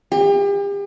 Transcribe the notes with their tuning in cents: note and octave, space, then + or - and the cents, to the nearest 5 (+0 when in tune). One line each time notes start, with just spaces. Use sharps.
G4 +40